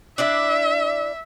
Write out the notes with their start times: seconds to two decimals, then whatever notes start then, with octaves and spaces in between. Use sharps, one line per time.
0.18 D4 E4 D5 E5